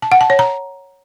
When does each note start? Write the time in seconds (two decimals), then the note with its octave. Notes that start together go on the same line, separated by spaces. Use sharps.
0.02 A5
0.12 F#5
0.21 A5
0.30 C#5
0.39 A#5